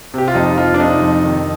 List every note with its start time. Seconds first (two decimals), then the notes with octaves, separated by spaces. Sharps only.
0.14 C3 G4
0.28 F4
0.35 F2 D#4
0.57 F3 F4
0.74 D4
0.80 C3 D#4
1.02 F2
1.24 D#3